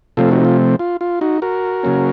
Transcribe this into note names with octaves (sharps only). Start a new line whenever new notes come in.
C3 F3 A3 C4 F4 A4
D#4 F#4
F4
F4
F4
D#4 F#4
F#4 A#4
C#3 F#3 A#3 C#4